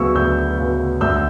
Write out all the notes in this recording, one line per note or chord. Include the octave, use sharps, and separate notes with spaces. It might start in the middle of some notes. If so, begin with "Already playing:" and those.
Already playing: D2 C#3 F#3 B3 C#6 E6
D2 E6 G6
C#3 F#3 B3
D2 E6 G6